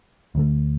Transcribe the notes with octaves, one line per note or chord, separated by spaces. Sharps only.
D2 D3 A3